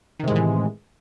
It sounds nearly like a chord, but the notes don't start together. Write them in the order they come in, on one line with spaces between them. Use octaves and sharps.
D#3 C3 G#3 A2 E3